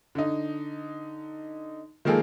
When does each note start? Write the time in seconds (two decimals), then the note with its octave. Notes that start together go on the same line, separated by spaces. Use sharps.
0.15 D3 D#4
2.05 D#3 F3 G#3 A#3 G#4 A4